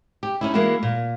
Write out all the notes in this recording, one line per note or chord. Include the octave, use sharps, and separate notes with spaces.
G4
C#4 D#4 E4
E3 G#3 A#3 B3 E4 F#4
A#2